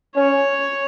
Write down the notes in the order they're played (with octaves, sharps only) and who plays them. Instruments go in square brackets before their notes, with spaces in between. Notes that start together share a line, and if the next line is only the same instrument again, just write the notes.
[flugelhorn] C#4 [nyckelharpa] C#5